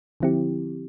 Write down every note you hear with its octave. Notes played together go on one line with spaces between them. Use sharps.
D3 F3 C4 E4 G4